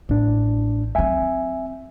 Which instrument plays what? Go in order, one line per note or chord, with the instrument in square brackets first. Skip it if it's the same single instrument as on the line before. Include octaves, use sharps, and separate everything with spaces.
[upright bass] A1 [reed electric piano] A2 D4
[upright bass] F#3 C4 [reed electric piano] E5 G#5